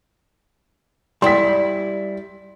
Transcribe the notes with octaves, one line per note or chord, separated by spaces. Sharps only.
G3 E4 C6 B6